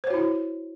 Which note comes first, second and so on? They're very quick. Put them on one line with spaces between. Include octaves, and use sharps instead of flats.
C5 C#5 F#4 E4